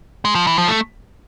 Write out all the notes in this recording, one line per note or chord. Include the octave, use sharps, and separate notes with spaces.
G#3
F3
E3
F3
A3